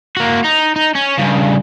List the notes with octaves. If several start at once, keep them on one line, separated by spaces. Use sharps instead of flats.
A#3 F#4
D#4
D#4
C#4
G2 C#3